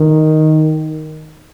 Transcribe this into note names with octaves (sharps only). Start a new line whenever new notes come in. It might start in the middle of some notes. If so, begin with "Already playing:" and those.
Already playing: D#3